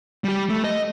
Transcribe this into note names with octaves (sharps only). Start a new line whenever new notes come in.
G3 G4
A3
D#5